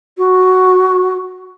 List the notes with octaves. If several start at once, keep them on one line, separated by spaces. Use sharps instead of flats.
F#4